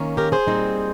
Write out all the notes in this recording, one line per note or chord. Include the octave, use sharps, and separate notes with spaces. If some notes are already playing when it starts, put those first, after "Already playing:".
Already playing: D#3 A#3 C#4
G4 A#4
G#4 C5
A#2 G3 C4 D#4